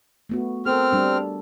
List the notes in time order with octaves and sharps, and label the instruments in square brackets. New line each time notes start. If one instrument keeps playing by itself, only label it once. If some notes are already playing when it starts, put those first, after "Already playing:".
[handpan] A3 B3 F#4
[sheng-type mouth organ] C4 F6 [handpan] A4 A#4
[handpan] G3 D4